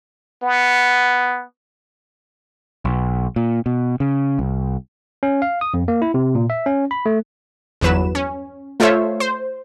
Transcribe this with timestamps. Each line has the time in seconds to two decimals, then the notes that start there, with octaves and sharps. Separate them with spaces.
0.43 B3
2.85 B1
3.36 A#2
3.66 B2
4.00 C#3
4.39 C2
5.23 C#4
5.42 F5
5.61 D#6
5.74 F2
5.88 A#3
6.02 E4
6.14 C3
6.35 A#2
6.50 E5
6.66 C#4
6.91 B5
7.06 A3
7.81 G1 E2 F#3 B4 E7
8.15 C#4
8.80 A3 F4 A4 C5 C#5 E5
9.20 C5